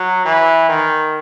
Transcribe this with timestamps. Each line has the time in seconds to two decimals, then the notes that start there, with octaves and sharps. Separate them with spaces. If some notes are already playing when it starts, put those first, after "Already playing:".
Already playing: F#3
0.25 E3
0.69 D#3